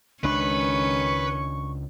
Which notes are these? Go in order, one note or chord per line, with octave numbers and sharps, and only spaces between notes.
C#2 D#3 G#3 C#4 D4 B4 C#6